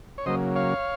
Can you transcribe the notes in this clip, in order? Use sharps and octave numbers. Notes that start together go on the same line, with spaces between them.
C#5
C#3 F#3 A#3 C5 D#5
C#5 F5